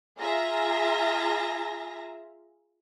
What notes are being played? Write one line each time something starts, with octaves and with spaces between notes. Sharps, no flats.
F4 G#4 E5 A#5 A#6